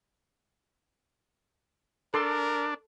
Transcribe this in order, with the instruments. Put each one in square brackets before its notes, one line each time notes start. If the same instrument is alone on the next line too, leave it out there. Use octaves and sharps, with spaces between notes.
[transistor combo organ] D4 [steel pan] A4 C6 D6 [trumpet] A#4